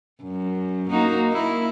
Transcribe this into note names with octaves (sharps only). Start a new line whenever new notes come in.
F#2
A#3 D#4 F#4
A#3 E4